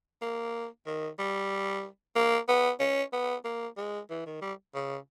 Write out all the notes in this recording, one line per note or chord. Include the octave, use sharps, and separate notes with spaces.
A#3
D#3
G3
A#3
B3
C#4
B3
A#3
G#3
E3
D#3
G3
C#3